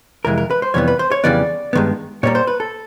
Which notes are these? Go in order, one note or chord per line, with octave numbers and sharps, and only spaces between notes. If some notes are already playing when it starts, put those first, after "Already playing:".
F2 C3 E3 G#3 A#4
A#4
B4
C5
F2 C3 E3 G3 B3 C#5
B4
C5
C#5
F2 C#3 E3 G3 B3 D5
G2 D#3 G#3 B3
A#2 G3 A#3 C#5
C5
B4
A4